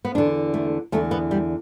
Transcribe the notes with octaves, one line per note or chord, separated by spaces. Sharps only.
B3
E2 D3 D4
A3
E2 D3 A3
B3
G3